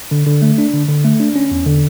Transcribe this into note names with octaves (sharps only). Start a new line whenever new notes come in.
D3
D3
A3
D4
D3
D3
A3
D4
C#4
E2
D3